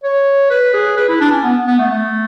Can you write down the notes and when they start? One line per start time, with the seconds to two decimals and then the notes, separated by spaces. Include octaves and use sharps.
0.03 C#5
0.50 B4
0.74 G#4
0.97 B4
1.08 E4
1.21 D4
1.32 C#4
1.43 B3
1.67 B3
1.79 A3
1.91 A3